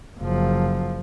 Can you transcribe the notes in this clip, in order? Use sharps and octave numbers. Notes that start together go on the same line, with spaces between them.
F#1 F3